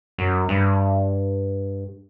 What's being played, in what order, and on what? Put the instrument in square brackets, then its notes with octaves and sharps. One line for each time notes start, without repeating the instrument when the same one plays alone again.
[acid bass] F#2
G2